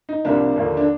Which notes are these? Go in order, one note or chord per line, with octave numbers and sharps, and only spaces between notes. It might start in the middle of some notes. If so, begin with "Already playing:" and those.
D#4
C2 C3 F3 A#3 D4
D#2 D3 F3 A#3
D4